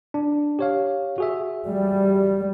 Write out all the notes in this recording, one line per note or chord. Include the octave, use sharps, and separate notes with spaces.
D4
G4 C#5 F5
F#4 G#4 E5
G3